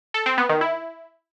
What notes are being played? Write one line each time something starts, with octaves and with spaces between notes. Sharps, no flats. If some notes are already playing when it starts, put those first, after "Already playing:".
A4
C4
B3
D#3
E4